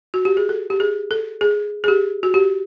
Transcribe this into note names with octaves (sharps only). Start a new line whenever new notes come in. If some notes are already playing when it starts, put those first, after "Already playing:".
F#4
G4
G#4
A4
G4
G#4
A4
G#4
G#4
G4
F#4
G4